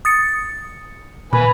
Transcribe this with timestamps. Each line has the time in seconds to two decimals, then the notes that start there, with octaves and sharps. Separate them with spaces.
0.05 D#6 A6 C#7
1.33 A#2 B4 G#5 B5